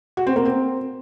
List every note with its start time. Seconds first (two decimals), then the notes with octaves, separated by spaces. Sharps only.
0.17 F#4
0.27 C4
0.36 A#3
0.45 C4